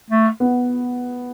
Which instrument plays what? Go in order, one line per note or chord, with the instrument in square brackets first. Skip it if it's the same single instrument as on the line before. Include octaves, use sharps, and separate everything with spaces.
[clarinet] A3
[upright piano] B3